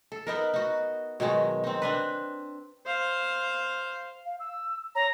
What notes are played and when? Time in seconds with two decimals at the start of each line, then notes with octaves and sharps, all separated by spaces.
0.12 A4
0.27 B3 D#4 A#4
0.54 D#4 F#4
1.20 B2 D#3 F#3 G#3
1.64 C4 D#4
1.82 C4 D4 B4
2.86 C5 F5
4.25 F5
4.40 E6
4.95 C#5 A#5